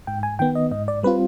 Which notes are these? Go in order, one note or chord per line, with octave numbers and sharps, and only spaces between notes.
G#2 G5
G#5
D#3 B3 G5
D#5
G#2 D#5
D5
G3 C4 F4 B4